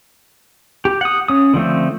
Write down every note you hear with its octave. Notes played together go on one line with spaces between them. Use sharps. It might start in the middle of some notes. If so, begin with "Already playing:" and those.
G4
F#5 D#6
C#4 D#6
D3 F3 A3 C4